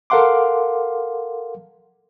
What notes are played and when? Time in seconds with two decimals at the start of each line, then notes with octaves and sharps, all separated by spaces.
0.10 A4 A#4 F5 F#5 C6 D6